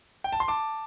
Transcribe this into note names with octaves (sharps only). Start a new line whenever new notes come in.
G5
A5
C6
A5 D6